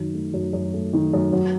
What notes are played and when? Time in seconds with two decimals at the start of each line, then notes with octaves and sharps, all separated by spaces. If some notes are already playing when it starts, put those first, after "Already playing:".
Already playing: F#2 D#3
0.14 A3
0.34 F#2
0.53 F#2
0.73 A3
0.93 D#3
1.14 F#2
1.33 F#3